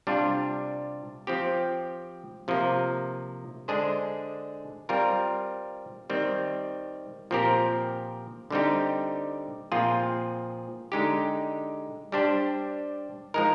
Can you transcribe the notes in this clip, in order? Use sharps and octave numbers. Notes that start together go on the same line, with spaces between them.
C3 G3 D4 F4
F3 C4 G4
C3 F3 A#3
D3 G#3 D4 G#4 C5
G3 C4 F4 A#4
D#3 G3 C4
A#2 F3 C4 G4 A#4
D3 G3 C4 D#4 G4
A#2 F3 C4 F4 G#4
D3 G#3 D#4 G4
G3 D4 G4 C5
F3 G#3 D#4 A#4